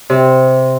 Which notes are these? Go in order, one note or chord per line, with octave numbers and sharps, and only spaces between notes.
C3